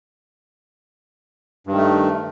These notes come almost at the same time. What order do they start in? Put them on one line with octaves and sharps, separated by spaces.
G2 D#3 A3